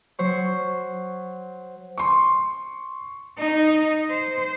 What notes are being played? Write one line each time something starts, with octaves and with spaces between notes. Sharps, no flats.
F#3 C5 C#6
C6 C#6
D#4
C5